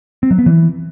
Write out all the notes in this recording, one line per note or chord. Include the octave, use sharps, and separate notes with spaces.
C4
F#3
B3
E3